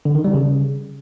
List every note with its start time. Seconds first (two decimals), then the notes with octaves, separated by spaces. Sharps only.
0.05 D3
0.15 D#3
0.24 G3
0.34 C#3